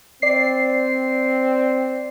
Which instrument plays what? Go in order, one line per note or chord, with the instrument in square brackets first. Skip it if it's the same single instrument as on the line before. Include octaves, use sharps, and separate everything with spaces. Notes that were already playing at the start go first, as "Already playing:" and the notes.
[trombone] C4 [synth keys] D5 C7